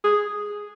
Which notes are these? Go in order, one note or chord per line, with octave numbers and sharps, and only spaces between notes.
G#4